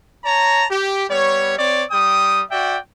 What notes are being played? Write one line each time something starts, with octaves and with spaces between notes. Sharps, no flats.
C#5 A5 A#5
G4
G3 B3 C#5
C4 C#5 D5
G3 G5 D#6
F#4 D5 E5 G5